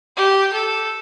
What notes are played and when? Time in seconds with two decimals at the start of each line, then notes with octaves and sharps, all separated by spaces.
0.16 G4
0.53 A4